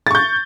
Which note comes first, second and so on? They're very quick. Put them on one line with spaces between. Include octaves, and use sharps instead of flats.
A6 C#6 G6